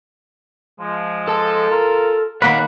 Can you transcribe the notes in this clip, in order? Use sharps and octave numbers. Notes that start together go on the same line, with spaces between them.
F3 G#3
A4 A5
F4 A#4
D#3 A#3 B4 C#5 F5 F#5